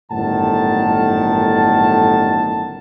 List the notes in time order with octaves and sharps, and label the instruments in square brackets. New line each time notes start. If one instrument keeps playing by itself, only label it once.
[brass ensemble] G1 F#2 A2 D#3 F#5 A5